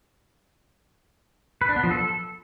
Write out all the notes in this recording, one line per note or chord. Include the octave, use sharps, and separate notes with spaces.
B4
D4
B3
F3
A4